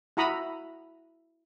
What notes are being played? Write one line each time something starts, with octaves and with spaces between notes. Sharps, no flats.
E4 F#4 A#5 B5 D#6